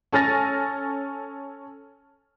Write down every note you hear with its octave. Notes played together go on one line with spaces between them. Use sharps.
C#4 A4 G#5 F6 A6 A#6